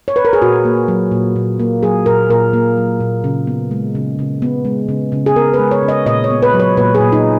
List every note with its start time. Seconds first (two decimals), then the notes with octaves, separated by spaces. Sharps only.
0.08 C#5
0.16 B4
0.25 A#4
0.33 G#4
0.42 A#2 F#4
0.65 A#3
0.88 F#3
1.12 A#2
1.36 A#2
1.60 A#3
1.83 F#3 G#4
2.06 A#2 A#4
2.30 A#2 A#4
2.53 A#3
2.77 F#3
3.00 A#2
3.24 C#3
3.47 B3
3.71 G#3
3.95 C#3
4.19 C#3
4.42 B3
4.65 G#3
4.89 C#3
5.12 C#3
5.26 G#4
5.36 B3 A#4
5.54 B4
5.59 G#3
5.71 C#5
5.83 C#3
5.88 D#5
6.06 A#2 D#5
6.24 C#5
6.30 B3
6.43 B4
6.54 F#3
6.60 C#5
6.77 A#2 B4
6.95 G#4
7.01 A#2
7.12 D#4